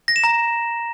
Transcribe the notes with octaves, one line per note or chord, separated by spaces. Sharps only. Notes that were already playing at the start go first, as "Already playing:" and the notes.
A#6
E7
A#5